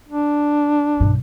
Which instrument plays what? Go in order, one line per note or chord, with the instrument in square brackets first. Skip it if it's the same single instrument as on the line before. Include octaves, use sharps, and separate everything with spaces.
[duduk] D4
[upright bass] B1 G2